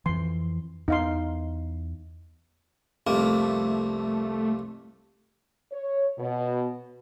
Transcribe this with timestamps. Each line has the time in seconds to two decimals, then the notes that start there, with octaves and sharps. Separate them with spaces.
0.06 F2 E3 C6
0.88 E2 D#4 F5 C6
3.07 C2 F2 A3 A#3
5.73 C#5
6.19 B2